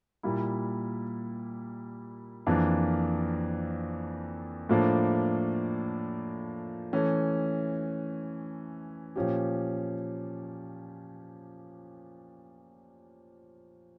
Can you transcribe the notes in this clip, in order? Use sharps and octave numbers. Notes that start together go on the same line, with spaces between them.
A#2 G3 A#3 E4
F2 E3 A#3 D4 F4
A2 F3 A#3 D4
E3 A3 C#4
A#2 F3 C#4 G4